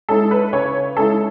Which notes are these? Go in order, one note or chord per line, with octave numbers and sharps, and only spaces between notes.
G#3 C#4 E4 A4
B4
C#3 C#5
G#3 C#4 E4 A4